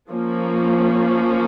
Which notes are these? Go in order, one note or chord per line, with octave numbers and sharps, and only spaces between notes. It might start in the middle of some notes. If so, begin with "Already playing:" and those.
F3 A#3 C#4